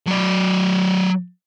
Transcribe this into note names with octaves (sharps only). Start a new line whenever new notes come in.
F#3 D5